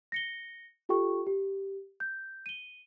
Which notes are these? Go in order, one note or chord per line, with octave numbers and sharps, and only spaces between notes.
A#6 C#7 G7
F4 G4 A4 G5 C#6
G4
G6
D#7 G7